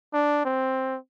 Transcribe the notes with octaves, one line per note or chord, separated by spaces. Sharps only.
D4
C4